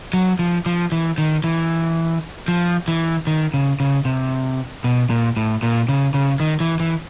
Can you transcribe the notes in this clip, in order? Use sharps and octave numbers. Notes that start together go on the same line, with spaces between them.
F#3
F3
F3
E3
D#3
E3
F3
E3
D#3
C#3
C#3
C3
B2
A#2
A2
A#2
C#3
C#3
D#3
E3
E3